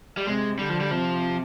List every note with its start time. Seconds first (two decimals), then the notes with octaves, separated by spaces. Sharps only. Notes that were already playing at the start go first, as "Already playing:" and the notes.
0.17 G3
0.26 C3 G#3
0.59 D3 G3
0.69 F3
0.81 G3
0.91 C3 F3